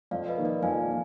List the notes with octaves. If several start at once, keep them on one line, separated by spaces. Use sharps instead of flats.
F2 D5 F5
B4 D#5
D#3 A#3
A#4 D5
F2 F5 G#5
A#3